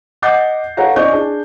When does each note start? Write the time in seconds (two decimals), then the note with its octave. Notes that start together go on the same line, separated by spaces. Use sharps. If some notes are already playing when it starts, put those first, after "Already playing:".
0.22 D#5 F#5 D6 G6 A6 C7
0.77 A4 B4 C#5 F5 F#5 A#5
0.96 C#4 D5 D#5 C#6 G6
1.12 D4 G#4